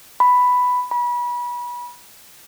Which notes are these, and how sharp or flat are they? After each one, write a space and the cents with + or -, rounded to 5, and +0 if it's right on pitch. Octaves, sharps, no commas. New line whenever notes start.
B5 +5
B5 -30